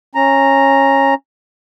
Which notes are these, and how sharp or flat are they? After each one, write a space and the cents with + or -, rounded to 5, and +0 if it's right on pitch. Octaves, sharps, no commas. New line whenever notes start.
C#4 -15 A#5 +0